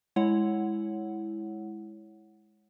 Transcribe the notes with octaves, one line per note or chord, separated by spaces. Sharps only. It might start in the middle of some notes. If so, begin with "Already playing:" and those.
G#3 E4 C#5 F#5